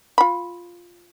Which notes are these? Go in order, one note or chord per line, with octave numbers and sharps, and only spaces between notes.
F4 B5